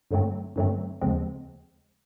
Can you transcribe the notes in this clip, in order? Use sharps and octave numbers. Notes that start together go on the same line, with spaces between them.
G2 D3 F#3 A3 C4
G2 D3 F#3 A3 C4
D#2 C#3 F3 G#3 C4